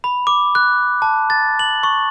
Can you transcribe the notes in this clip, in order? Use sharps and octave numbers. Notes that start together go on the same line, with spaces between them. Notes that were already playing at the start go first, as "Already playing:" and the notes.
B5
D6
F#6
A5
A6
F#7
C#6